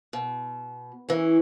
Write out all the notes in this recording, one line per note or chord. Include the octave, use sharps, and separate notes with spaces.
B2
E3 C#4